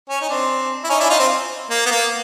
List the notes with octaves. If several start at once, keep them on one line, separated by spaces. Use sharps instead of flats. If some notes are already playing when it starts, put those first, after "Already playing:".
C#4
D#4
C4 D4
E4
C#4 D#4
D4 E4
D#4 F4
C4
A#3
B3
A#3